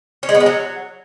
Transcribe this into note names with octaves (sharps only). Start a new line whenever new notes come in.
C#4
G#3
B3
G#3
F#3